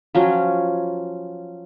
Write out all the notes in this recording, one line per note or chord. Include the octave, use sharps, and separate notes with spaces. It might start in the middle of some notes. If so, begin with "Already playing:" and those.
F3 F#3 C#4